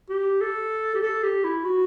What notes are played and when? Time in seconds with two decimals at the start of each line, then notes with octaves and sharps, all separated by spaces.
0.10 G4
0.41 A4
0.95 G4
1.03 A4
1.23 G4
1.44 E4
1.65 F#4